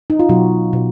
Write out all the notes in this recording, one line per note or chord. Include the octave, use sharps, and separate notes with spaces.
D#4
F4
B2 F#3 F#4
B2